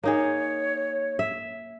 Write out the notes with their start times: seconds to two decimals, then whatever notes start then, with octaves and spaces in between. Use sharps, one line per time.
0.04 A#3 D#4 G#4 C#5
1.19 E5